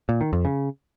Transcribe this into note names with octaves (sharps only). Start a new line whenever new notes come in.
A#2
D#3
F2
C#3